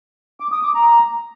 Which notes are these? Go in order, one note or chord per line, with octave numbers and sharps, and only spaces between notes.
D6
D#6
D6
A#5